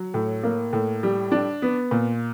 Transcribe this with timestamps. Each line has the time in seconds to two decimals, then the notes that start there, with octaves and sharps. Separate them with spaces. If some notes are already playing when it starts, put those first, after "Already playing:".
Already playing: F#3
0.14 A2
0.43 A#3
0.73 A2
1.03 G3
1.32 D4
1.62 B3
1.91 A#2